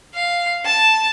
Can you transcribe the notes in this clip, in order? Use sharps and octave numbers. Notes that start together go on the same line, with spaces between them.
F5
A5